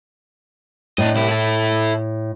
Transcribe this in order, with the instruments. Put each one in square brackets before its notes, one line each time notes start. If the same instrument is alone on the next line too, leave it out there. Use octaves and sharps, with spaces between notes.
[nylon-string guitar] A2 [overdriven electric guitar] D4 D#5
[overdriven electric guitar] C2 E4
E4 A4